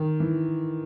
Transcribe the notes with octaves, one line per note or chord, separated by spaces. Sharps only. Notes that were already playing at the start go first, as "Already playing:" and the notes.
Already playing: D#3
E3